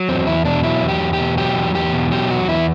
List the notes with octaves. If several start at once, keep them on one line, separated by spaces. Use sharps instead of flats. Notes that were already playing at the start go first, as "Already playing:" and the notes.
Already playing: F#3
E2 C4
E2 E4
B2 D4
F#3 E4
E2
G4
E2
G4
B2
F#3 G4
E2
E2 G4
B2
F#3 G4
E2 F#4
E2 E4